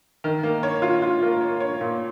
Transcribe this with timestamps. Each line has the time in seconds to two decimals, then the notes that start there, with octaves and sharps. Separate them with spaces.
0.24 D#3
0.43 A#3
0.63 C#5
0.82 F4
1.02 F4
1.22 A#3
1.41 C#5
1.60 C#5
1.81 A#2